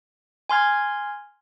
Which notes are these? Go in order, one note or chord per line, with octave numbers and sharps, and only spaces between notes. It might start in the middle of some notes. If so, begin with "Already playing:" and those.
G#5 C6 F6 G#6